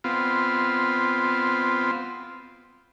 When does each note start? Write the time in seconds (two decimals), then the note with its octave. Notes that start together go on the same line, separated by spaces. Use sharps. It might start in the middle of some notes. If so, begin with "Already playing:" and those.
0.04 B3 C4 F4